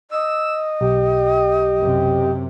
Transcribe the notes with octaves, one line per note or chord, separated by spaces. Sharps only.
D#5 E6
B1 G4
F#2 C3